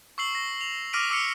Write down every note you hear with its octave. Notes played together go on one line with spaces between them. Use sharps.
C#6 E6 C7 F#7
A#6
F7
D6 F6 A#6 B6 D7 D#7
D6 E6 C7 C#7